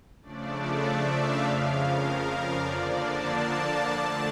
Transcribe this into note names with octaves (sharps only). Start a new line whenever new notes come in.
C#3 F3 A3 D4 D5
E5
F5
F2 C#3 F3
A#4
D5
D3 F3 A#3 D4
A5
A5
D3 A3 D4